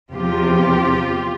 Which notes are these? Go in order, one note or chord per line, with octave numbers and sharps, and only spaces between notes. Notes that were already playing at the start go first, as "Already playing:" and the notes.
E2 C3 F3 F4 G4